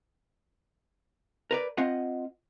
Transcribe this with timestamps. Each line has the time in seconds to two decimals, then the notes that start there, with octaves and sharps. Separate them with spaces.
1.51 A#4 B4 D5
1.77 C4 F4 D#5 F#5